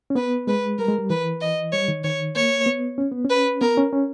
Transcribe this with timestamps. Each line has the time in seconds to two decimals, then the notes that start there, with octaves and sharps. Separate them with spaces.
0.10 C#4
0.15 B3 B4
0.47 G#3 B4
0.78 G3 A#4
0.88 G#3
0.99 G3
1.10 E3 B4
1.41 D#5
1.72 G3 C#5
1.88 D#3
2.04 D#3 C#5
2.36 A#3 C#5
2.66 B3
2.98 C#4
3.11 B3
3.25 C#4
3.30 B4
3.61 B3 A#4
3.77 C#4
3.93 C#4